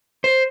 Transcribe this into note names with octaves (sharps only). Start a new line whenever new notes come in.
C5